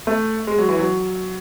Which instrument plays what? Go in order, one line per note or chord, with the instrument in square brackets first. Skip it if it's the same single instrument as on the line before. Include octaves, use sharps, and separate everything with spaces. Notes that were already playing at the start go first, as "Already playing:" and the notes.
[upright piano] A3
G#3
F#3
E3
F#3